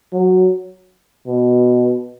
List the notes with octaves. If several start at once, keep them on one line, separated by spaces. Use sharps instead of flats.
F#3
B2